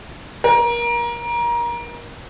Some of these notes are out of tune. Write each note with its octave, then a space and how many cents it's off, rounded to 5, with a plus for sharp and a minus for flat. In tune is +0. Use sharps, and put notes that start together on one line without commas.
A#4 +25